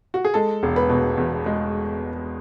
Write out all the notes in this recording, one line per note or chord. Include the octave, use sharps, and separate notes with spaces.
F#4
G#4
G#3 A4
E1
B4
B2
E2
G#3